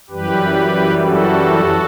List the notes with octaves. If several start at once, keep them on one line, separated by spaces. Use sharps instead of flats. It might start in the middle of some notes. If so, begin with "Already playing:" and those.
F#2 E3 G3 G4 B4
F#4 A4